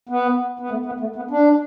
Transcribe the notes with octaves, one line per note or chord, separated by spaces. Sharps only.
B3
B3
A3
B3
A3
B3
D4